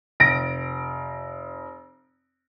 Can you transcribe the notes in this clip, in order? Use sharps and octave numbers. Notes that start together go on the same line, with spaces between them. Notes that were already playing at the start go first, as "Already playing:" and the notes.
F1 A#6 D7